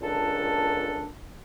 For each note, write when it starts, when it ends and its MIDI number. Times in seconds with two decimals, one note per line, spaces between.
0.02 1.09 37
0.02 1.09 46
0.02 1.09 62
0.02 1.09 69